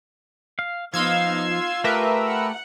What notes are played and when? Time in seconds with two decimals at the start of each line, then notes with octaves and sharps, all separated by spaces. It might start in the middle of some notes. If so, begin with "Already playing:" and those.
0.59 F5
0.94 F3 B3 D#4 F5 C6 E6 G#6
1.48 F4 F5
1.84 A3 G4 A#4 B4 E5
2.28 F#5